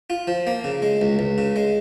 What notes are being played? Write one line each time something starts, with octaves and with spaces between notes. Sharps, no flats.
F4
F3
A#3
C#3
G#3
C#2
C#2
C#3
G#3